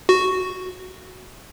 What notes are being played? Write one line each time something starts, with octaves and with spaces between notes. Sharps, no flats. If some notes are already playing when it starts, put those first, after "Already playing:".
F#4